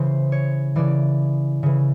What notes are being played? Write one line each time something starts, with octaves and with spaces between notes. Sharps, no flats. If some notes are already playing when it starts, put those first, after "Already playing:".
Already playing: C#3 E3 C5
C#5
C#3 E3 D5
C#3 E3